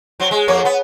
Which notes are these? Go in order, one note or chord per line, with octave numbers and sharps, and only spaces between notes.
F#3 C4
G#3
F2 A#3 C#5
B3